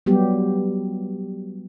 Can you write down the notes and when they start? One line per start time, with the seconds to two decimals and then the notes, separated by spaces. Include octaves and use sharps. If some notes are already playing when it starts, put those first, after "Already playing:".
0.06 F#3 G3 B3 G4